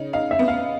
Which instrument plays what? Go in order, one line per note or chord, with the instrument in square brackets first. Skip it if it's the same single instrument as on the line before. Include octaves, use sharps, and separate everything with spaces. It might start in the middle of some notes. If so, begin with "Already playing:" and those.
Already playing: [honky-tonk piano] C#3 D#4
[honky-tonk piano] D#4 [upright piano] F5
[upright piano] E5
[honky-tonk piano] B3
[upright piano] F5